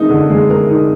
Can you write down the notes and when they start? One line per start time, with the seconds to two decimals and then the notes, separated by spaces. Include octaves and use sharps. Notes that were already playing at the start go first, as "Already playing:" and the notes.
Already playing: G#3 D#4 A#4
0.09 D3
0.30 G#3
0.50 A#4
0.69 D#4